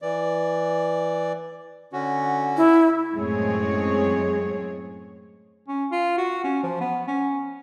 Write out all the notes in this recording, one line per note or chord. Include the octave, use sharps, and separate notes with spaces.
E3 D5
D3 C#4 F#4
E4
F#2 A2 G#3 C4 G#4 C#5
C#4
F4
F#4
C#4
F3
B3
C#4